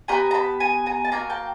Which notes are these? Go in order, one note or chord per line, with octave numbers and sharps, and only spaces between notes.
B3 D4 G4 G#5 A#5
A#5
A5 B5
G#5 A#5
G#5 A#5
A5
A#3 D4 F#4 G#5 A#5
G5 A5